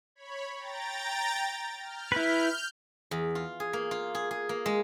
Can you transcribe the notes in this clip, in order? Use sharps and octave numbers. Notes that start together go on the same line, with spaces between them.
C#5 B5
G5 A#5 A6
F6 G6
E4 B4
E2
F4
G#4
A#3
F4
G#4
G#4
A#3
G#3